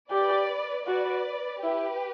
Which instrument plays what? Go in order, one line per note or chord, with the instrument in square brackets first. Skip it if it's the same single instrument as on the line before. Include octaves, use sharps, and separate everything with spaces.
[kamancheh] G4 [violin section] B4 D5
[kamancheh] F#4 [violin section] B4 D5
[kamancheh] E4 [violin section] G4 B4